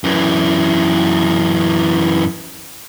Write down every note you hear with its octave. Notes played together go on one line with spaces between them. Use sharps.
F#2 E3